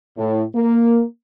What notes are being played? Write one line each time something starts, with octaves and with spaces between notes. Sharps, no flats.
A2
A#3